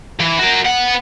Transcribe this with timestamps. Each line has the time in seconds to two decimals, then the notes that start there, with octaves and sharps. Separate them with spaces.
0.20 E3
0.39 F#4 A#4
0.66 B3 F#5